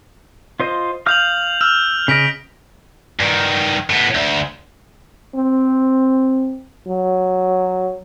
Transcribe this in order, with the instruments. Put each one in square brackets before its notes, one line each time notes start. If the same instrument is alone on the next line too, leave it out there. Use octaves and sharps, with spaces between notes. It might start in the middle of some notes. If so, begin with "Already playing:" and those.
[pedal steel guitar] F4 C5 D#5
[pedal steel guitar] F5 D#6 F6 [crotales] G6 F7 F#7
[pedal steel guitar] E6 [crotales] F6 F7
[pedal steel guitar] C#3 D#5 [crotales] F6 B6 D7
[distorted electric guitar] G2 D#3
A2 B3
D2
[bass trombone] C4
F#3